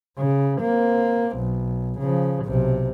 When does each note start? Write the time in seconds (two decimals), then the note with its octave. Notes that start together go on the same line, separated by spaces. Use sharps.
0.18 C#3
0.59 A#3 C4
1.37 B1
1.99 C#3 F3
2.45 B1 C3